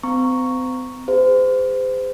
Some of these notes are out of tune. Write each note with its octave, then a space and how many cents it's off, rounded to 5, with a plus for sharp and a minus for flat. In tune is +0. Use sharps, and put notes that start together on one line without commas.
C4 -40 A#5 +0 C#6 +0
G#4 -40 C5 -35 E5 +0